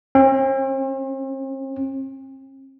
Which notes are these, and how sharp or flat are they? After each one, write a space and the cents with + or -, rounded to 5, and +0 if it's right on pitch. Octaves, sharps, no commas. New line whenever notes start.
C4 +45